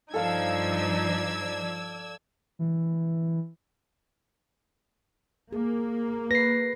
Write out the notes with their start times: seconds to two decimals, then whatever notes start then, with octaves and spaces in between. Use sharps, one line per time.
0.14 G2 F3 D#4 A4 D5 F5 E6 G#6
2.59 E3
5.53 A#3 G#4
6.31 B4 A#6 C7